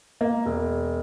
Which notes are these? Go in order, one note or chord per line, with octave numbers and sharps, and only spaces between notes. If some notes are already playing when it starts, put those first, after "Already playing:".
A#3
E1